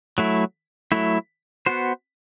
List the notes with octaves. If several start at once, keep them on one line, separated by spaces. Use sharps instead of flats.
F#3 A3 E4
F#3 A3 E4
B3 F#4 C5